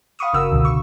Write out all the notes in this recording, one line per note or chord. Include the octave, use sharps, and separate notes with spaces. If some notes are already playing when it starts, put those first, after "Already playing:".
F5 B5 C#6 D#6
G1 C#3 F#4 A#4 E6
C#2 B2 D3
C#6